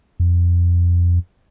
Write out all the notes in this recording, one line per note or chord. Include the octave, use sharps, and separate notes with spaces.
F2